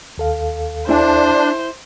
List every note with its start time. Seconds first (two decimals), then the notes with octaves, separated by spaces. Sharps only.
0.18 D#2 A4 F5
0.89 D4 E4 C5 G#5